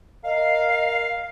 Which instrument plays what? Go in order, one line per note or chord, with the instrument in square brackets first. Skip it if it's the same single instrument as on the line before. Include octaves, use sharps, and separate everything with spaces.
[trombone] A#4 [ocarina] D#5 [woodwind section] F5